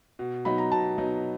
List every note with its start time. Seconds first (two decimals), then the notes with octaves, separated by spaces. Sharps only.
0.19 B2
0.45 F#3 B3 D#4 B5
0.58 A#5
0.71 B2 A5
0.98 F#3 B3 D#4